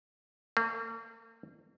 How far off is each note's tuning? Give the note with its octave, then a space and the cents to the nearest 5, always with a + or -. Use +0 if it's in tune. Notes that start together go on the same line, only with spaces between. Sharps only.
A#3 -40